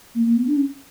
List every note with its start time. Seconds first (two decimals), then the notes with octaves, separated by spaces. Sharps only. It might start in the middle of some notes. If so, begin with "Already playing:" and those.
0.15 A#3
0.25 A#3
0.36 B3
0.47 D4
0.57 C#4